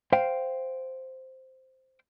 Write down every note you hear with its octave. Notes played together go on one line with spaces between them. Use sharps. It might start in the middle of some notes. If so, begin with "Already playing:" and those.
C5 F5 G5